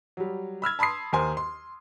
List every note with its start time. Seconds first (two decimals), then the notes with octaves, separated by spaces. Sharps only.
0.17 F#3 G3
0.62 B5 E6 F6 G#6
0.79 A5 B5 C6 D#6 C7
1.13 D#2 A#4 C5 G#5 C6
1.37 C6